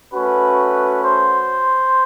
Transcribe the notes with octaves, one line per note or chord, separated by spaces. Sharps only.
A3 C#4 F#4 B4
C5